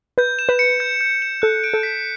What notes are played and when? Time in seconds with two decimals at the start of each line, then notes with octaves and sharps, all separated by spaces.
0.18 B4 G6
0.39 E7
0.49 B4
0.59 C#7
0.80 G6
1.01 G6
1.22 E7
1.42 A4 F#6
1.64 D7
1.74 A4
1.83 B6